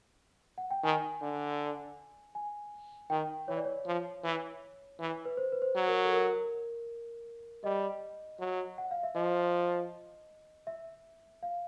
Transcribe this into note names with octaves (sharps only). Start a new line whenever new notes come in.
F#5
G5
D#3 G#5
D3
G#5
D#3 G5
E3 C#5
D5
C#5
F3
E3
E3
B4
C5
B4
C5
F#3
A#4
A4
A#4
G3 D#5
F#3
F#5
F5
E5
F3 D#5
E5
F5